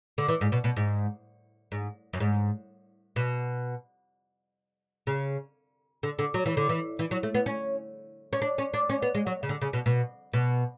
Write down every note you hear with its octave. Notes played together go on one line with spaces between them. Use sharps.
D3
E3
G#2
B2
B2
G#2
G#2
F#2
G#2
B2
C#3
D3
D3
F#3
E3
D3
E3
E3
F#3
A3
B3
C#4
C#4
D4
C#4
D4
C#4
B3
G#3
F#3
C#3
D3
C#3
B2
B2
B2